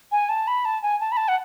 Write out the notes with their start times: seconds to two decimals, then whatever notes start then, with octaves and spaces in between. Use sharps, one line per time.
0.12 G#5
0.29 A5
0.48 B5
0.65 A5
0.83 G#5
1.00 A5
1.12 B5
1.17 A5
1.28 F#5